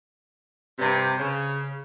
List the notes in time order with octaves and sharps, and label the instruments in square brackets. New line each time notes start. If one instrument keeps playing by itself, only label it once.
[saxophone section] G2 C3
C#3